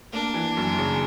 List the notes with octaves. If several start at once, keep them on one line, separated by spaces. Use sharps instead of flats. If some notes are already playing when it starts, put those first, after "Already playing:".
A#3 D4
E3
F#2
C#3